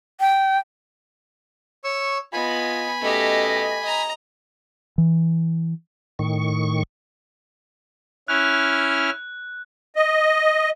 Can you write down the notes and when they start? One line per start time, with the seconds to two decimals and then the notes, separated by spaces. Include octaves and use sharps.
0.20 G5
1.84 C#5 C#6 E6
2.33 B3 F4 D#5 G#5 B5
3.01 B2 A3 C#4 G4 D#5
3.83 D#5 A#5
4.98 E3
6.19 A2 D#3 C#6
8.28 C#4 E4 F6 F#6
9.96 D#5